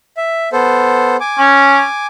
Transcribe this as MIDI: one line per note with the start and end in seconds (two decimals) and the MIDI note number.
0.17 0.49 76
0.53 1.16 59
0.53 1.16 69
0.53 1.16 72
1.20 2.07 80
1.20 2.07 86
1.39 1.83 61